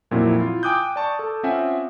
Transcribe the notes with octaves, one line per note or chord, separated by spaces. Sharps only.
F2 A#2 F3 F#3 C4 E4
E4 F4
G5 G#5 D6 D#6 F#6 G6
D5 A5 C#6
A4 A5
C4 C#4 F4 E5 F#5 G#5